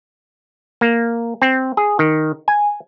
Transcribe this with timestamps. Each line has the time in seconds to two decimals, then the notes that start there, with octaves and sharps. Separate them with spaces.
0.81 A#3
1.42 C4
1.77 G#4
1.99 D#3
2.48 G#5